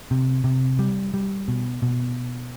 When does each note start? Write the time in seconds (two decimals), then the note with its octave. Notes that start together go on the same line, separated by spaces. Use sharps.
0.11 C3
0.44 C3
0.79 G3
1.14 G3
1.48 B2
1.82 B2